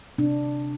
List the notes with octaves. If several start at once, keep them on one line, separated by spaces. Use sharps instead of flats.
C3 D4